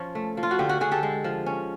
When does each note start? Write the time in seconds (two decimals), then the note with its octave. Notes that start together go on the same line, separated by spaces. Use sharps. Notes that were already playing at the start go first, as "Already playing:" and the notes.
Already playing: F3 C#4 C#5
0.15 A3
0.37 F3
0.43 F4
0.51 F#4
0.59 D3 F4 G4
0.69 F#4
0.80 D3 F#4 G#4
0.91 G4 A4
1.03 G#3
1.24 F3
1.46 C#4